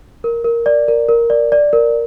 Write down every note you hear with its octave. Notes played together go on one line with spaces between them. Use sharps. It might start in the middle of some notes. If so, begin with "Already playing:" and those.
A#4
A#4
D5
A#4
A#4
D5
D5
A#4